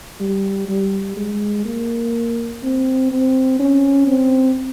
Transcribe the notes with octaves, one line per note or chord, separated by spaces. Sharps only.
G3
G3
G#3
A#3
C4
C4
C#4
C4